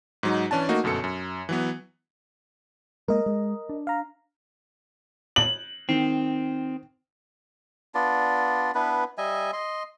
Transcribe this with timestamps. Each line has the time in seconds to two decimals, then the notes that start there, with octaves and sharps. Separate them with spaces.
0.23 G#2 F#3 D#4
0.51 E3 C#4 D4 A5
0.69 A3 A#3 D#4 F#4
0.84 G1 F#2 B2 A4 C#7
1.04 F#2
1.49 E3 F#3 B3
3.08 G#3 A#3 A#4 D#5
3.26 G#3
3.69 D4
3.87 F5 A#5
5.36 F#7
5.89 D#3 C4
7.95 B3 D4 F4 D5
8.75 B3 D4 E4 B4
9.18 G3 D#5 E5 G#5
9.53 D#5 C6